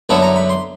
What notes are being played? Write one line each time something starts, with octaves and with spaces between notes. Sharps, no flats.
F#2 D3 F#3 B3 E4 A5
A#5
B5
C6